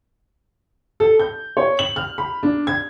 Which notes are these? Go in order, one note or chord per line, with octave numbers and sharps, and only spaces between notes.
A4
G6
C#5
F#7
F6
B5
D4
G#6